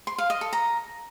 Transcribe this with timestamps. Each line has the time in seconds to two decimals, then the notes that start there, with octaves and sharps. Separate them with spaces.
0.07 C6
0.18 F5
0.30 D#5
0.41 A4
0.53 A#5